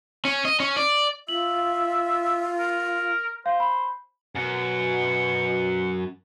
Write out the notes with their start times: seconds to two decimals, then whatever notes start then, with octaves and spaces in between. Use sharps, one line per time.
0.25 C#4
0.45 D#5
0.60 C#4
0.77 D5
1.29 F4 E5 F#7
2.59 A#4
3.46 C5 F5
3.60 B5
4.35 F#2 B2 F#5